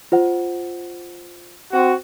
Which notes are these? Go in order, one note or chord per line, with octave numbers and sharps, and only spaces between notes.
F4 C5 F#5
C4 F#4